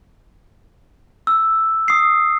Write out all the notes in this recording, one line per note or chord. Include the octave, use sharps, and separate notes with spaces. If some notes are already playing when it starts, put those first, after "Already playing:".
E6
D#6 C7